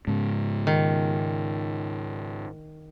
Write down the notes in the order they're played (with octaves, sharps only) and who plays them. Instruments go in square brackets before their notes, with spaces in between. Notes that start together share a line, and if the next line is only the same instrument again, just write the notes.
[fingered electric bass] G#2 C#3
[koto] D#3